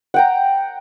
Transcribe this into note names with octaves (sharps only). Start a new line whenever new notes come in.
F#5 G5 A#5